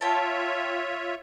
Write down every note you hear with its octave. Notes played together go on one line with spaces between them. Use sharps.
F4 C#5 E5 G5 A5